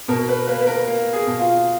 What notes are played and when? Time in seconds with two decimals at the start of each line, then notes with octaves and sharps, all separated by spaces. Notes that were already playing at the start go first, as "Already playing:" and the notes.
0.08 B2 A#4
0.29 B4
0.47 A#3 B4
0.62 B4
0.67 A#4
0.87 A#3
1.13 G#4
1.27 B2
1.39 F4